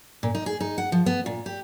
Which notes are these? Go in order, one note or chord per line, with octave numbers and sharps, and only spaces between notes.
A#2
D#4
G#4
D#4
F#5
F3
B3
A#2
G4